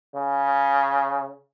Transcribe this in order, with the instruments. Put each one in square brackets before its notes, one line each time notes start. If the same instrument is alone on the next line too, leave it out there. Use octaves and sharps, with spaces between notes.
[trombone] C#3